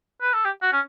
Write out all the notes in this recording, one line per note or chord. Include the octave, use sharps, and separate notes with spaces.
B4
A4
G4
F#4
C#4